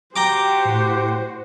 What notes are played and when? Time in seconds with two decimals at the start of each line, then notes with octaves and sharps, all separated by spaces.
0.16 F#4 G4 C5 G5 A#5 D6
0.65 A2